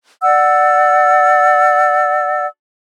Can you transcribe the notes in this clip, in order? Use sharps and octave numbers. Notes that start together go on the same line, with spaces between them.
D5 F#5 E6